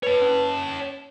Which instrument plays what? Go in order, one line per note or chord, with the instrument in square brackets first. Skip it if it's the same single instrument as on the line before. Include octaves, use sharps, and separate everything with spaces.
[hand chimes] B4 [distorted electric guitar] C#5 A5
[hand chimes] C#4